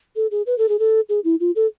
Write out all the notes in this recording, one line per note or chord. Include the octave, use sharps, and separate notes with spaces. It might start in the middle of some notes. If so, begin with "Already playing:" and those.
A4
G#4
B4
A4
G#4
A4
G#4
E4
F4
A4